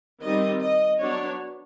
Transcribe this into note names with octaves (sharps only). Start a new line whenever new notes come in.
D#3 G3 C4 D#5
D#5
F#3 B3 D4 C#5